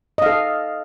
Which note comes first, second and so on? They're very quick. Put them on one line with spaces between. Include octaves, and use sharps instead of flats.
D#5 F5 A4